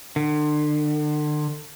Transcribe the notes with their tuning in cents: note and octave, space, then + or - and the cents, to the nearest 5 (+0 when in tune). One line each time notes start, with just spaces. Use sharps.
D3 +35